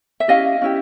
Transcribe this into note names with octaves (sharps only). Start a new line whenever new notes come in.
E5
C#4 E4 G4 D#5 F5
C#4 E4 G4